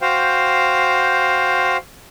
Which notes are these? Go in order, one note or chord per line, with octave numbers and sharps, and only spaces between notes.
F#4 C5 F5 G5